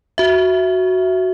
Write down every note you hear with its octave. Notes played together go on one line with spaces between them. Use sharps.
F#4 E5